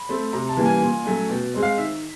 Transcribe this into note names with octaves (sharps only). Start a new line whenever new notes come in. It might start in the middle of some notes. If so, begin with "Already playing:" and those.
Already playing: B5
A3 C4
C3 A#5
A5
E3 G3 A#3 C#4
G#5
A#2
F#3 A3 C#4
B2 G5
G#3 C4
F5
D#3 E5